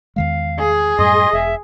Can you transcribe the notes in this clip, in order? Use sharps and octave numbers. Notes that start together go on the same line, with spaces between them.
E2 D#3 G#3 F5
G#4
F#2 A2 G3 D#5 C6
E1 E5